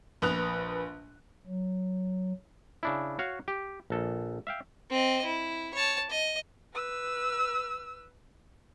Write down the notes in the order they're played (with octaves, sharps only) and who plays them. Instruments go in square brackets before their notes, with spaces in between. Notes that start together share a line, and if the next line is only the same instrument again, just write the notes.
[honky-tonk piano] A#1 B4 D#6 F#6 F7
[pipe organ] F#3
[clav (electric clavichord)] C#3 D4 E4
F#4 C#5 F5
G4
A#1 A4
E5 F5 G5
[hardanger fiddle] C4 D#5
E4
C#5 A5
D#5
[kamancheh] B4 E6